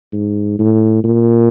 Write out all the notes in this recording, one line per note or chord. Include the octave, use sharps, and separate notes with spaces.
G#2
A2
A#2